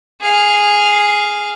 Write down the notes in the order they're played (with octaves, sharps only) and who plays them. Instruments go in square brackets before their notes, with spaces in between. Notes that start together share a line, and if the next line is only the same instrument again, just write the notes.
[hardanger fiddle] G#4 F5